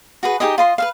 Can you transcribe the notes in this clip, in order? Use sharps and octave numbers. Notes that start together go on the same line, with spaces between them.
F#4 G#4 B4
D#4 G4 G#4 D#5
F4 D#5 C6
B4 E5 F5